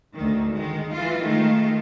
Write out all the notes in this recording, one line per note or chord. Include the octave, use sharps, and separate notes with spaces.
D2 D#3
D#3 G#3
E3 F4
D#3 G#3 A3 F4